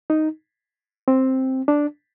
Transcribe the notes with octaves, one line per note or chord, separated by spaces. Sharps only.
D#4
C4
D4